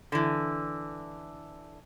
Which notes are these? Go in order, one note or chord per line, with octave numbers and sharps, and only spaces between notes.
D3 E3